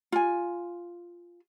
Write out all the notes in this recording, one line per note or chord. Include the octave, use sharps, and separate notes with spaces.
F4 G#5